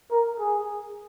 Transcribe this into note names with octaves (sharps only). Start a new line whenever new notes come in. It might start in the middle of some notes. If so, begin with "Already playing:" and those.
A#4
G#4